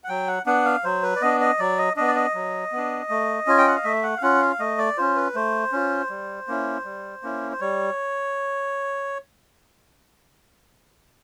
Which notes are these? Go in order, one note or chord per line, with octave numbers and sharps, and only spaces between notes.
F#5
F#3 G5
F#5
B3 D4 F#5
F5
F#3 C5
B4
D5
B3 D4 D#5
D#5
F#3 D5
D#5
B3 D4 D#5
D5
D#5
F#3
B3 D4
A3
C#4 F4 G#5
G5
F#5
F5
A3 E5
F#5
F5
C#4 F4 F#5
F5
A3 D#5
D5
C#4 F4 C5
B4
A3 C5
C#4 F4
G3
A#3 C#4 E4
G3
A#3 C#4 E4
C5
G3 C#5